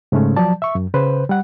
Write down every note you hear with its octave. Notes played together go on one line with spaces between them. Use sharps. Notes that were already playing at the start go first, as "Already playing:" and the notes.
G#2 C#3 G#3 A3 C#4
F3 F#3 D5 A5
E5 C#6
F#2
C#3 B4 C5
G3 F#5